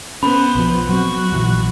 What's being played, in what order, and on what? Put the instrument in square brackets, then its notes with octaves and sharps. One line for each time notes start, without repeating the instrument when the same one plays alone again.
[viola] B3 C5 [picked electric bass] C#4 [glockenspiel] B5
[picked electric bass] B1 F3
[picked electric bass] F#3 C4 [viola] F#4
[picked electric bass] A#1 E3 F#3